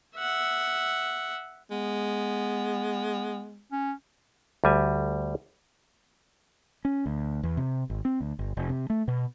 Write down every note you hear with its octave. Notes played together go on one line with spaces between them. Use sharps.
E5 F#5
G#3 B3
C#4
D2 G3 G#5
C#4
D2
E2
C3
G#1
C4
D2
G1
F1
C3
A3
B2